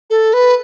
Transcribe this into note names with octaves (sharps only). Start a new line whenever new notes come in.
A4
B4